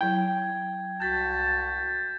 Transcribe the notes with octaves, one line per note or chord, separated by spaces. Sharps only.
F#3 E4 G5 G#6
C2 F#4 A5 G6 A6 B6